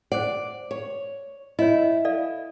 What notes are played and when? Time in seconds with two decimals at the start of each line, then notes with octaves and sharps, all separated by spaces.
0.12 C5 D5 F#5
0.71 C#5
1.59 E4 C#5 D#5
2.05 A4 D5 F5